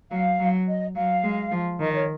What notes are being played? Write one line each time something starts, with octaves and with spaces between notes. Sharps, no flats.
F#3 F5
F#3
D#5
F#3 F5
G#3
F3
D#3 D#5
C#5